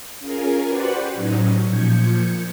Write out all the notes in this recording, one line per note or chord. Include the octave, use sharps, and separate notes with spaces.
C#4 F4 G#4 A#4 G#5 A#5
F#4 G4 B4 C5 D5 F#5
A2 F#3 C#4 D#4
A#2 F3 G6 G#6 C#7